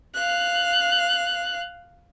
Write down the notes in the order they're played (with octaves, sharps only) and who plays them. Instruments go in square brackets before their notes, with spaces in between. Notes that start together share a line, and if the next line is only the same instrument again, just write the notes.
[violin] F5 F#6